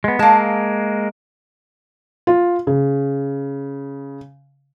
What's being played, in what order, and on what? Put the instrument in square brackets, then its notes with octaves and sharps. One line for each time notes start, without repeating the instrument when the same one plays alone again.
[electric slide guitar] G#3 B3
[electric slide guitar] G#3 A#3 [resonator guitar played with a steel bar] F5 A5
[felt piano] F4
C#3